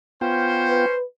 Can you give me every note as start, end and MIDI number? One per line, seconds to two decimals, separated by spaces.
0.21 0.86 59
0.21 0.94 61
0.21 0.86 65
0.21 0.94 72
0.21 0.86 79
0.70 1.04 71